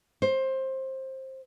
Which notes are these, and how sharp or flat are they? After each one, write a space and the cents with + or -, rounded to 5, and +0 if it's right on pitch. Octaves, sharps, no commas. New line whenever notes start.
C5 +20